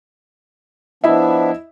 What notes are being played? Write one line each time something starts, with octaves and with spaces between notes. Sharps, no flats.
F3 B3 D4 E4 D#5 E5